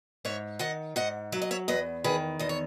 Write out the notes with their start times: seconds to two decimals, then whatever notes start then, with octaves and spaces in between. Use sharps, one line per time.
0.25 G#2 C#5 E5
0.60 D#3 D#5 F#5
0.96 G#2 D#5 F#5
1.32 F#3 E5
1.42 D#5
1.51 C#5 E5
1.68 E2 B4 D#5
2.04 D#3 G#4 B4
2.39 E2 D#5
2.49 C#5